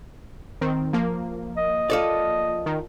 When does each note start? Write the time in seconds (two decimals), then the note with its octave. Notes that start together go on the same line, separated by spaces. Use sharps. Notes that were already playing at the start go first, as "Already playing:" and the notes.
0.61 D#3 C4
0.93 F3 A#3
1.57 D#5
1.90 F4 A4 D5
2.66 D#3